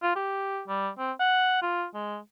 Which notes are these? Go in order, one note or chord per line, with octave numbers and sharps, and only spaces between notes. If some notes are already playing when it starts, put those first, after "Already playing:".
F4
G4
G3
C4
F#5
F4
G#3